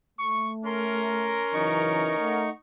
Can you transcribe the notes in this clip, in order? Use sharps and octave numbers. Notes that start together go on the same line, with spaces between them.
A3 C#6
C#4 A#4 C6
F#2 C#3 E3 D#4 C#6
A3 F#5